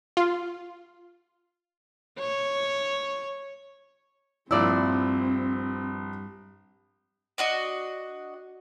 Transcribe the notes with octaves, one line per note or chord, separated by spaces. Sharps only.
F4
C#5
A#1 G2 C4 E4 D5 E6
D4 F#4 D#5